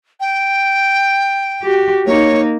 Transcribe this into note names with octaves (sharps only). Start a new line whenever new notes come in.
G5
F#4 G4
A#3 D#4 C#5